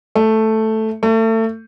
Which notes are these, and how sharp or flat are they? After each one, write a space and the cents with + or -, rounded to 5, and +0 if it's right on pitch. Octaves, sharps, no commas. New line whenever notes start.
A3 +0
A3 +30